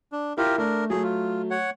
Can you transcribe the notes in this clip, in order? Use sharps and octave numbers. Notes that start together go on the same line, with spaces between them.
D4
E4 F4 G4 A#4
A3 D4 A#4
F#3 A3 G#4
F4
C#5 F#5